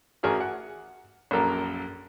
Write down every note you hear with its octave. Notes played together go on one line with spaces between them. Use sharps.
A1 F#4 G#4 A#4 F6
F#5
A#1 F#2 A#3 A4 A#4